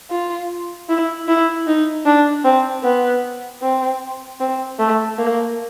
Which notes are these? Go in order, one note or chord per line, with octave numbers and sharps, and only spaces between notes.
F4
E4
E4
D#4
D4
C4
B3
C4
C4
A3
A#3